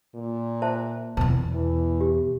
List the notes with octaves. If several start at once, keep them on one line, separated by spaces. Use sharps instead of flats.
A#2
C5 E5 A5
E2 B2 A5
E3
G4